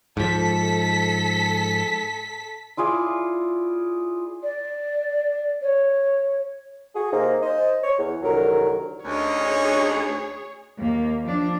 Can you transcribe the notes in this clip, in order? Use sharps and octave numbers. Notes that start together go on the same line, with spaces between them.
G#2 F3 A4 B6
E4 F4 G#4 D5
D5
C#5
F#4 G#4
C3 A#3 D#4 G#4 C5
C5 D#5
C#5
E2
C2 D3 D#3 F#3 A#4
D2 C#4 D#4 G#4 C#5
D#2 A#3
F3 D4